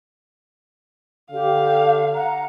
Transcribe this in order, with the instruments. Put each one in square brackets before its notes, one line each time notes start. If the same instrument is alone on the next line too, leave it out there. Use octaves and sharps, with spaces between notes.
[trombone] D3 [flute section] G4 [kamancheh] F5
[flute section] F#5 A#5